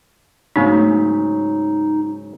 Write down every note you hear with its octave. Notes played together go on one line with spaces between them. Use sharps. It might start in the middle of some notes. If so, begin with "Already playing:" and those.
G#2 C#3 F#3 A3 B3 D4 D#4